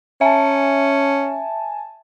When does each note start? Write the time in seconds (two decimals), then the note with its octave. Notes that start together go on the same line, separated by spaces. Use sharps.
0.21 C#4 E5 G#5 A5